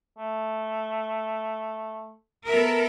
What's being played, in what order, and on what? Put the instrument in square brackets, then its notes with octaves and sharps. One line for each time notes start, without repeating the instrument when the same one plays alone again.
[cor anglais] A3
[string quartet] B3 E5 [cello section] A4 A#4